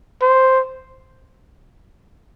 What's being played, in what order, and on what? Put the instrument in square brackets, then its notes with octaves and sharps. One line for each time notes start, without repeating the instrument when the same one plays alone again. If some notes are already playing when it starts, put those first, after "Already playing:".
[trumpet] C5